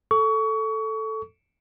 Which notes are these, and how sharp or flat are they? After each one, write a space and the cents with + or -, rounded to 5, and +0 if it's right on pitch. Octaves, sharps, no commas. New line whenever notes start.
A4 +0 C#6 +30